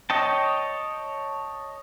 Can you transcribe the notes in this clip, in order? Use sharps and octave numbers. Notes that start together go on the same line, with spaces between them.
C#5 D#5 G5 A5